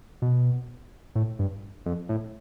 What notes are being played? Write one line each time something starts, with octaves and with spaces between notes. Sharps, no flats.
B2
A2
G2
F2
A2